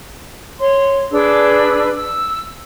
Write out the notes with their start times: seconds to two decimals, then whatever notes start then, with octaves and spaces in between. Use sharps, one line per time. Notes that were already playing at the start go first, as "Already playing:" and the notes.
0.60 C#5 C6
1.12 D4 G#4 B4 E6
1.95 E6